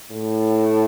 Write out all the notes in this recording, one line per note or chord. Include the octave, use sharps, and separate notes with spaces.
A2